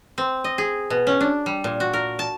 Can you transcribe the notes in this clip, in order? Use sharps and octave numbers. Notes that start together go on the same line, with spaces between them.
C4
D#5
G#4
B2
C#4
D4
G3
A#2
F#4
A#4
A5